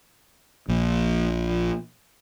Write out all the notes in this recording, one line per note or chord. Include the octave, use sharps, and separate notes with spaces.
A#1 A#2